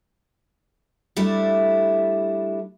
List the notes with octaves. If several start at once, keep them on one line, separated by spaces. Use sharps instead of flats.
G3 A3 D4 E4